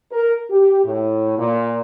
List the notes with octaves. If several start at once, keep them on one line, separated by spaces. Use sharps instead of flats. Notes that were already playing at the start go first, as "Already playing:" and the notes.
A#4
G4
A2
A#2